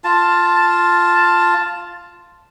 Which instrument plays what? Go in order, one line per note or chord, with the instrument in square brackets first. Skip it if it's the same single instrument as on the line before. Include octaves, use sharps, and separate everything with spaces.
[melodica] F4 A5